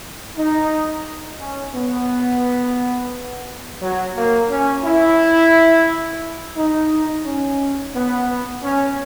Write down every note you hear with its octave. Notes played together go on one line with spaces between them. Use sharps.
D#4
C#4
B3
F#3
A#3
C#4
E4
D#4
C#4
B3
C#4